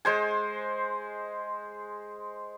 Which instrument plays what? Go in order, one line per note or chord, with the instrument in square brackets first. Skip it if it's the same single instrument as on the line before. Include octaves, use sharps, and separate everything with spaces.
[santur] G#3 C5 G#5